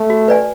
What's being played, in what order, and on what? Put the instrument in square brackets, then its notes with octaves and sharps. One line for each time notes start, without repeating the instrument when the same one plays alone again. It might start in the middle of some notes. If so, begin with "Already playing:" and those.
Already playing: [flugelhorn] A3
[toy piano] F#4
B4 D5 G#5